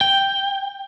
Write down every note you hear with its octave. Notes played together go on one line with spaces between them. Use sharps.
G5